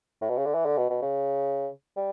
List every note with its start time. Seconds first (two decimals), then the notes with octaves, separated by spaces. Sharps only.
0.21 A2
0.29 B2
0.37 C#3
0.45 D3
0.54 E3
0.66 D3
0.77 B2
0.90 B2
1.02 C#3
1.96 G3